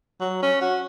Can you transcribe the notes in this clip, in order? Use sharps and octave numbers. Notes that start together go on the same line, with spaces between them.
F#3
C#4
F#4